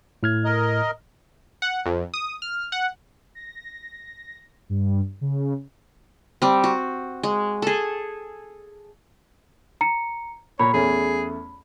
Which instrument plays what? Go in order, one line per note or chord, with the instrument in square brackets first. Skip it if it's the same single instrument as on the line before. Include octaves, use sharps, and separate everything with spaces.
[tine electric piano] A2 F6 G#6
[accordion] A#4 D#5
[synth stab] F#5
F2
D#6
F6
F#5
[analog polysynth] A#6
G2
C#3
[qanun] G3 C4
F#4
G#3
G#4 A4
[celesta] A#5 C#7
[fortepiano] A#2 A#5 [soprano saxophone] C#5 [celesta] B5
[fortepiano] E2 A3 C#4 [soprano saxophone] G#4